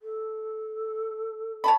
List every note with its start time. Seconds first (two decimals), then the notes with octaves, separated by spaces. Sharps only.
0.02 A4
1.64 C#5 A5 B5